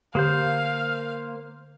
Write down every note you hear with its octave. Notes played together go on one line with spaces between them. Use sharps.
D3 A#3 G4 C5 F5 G6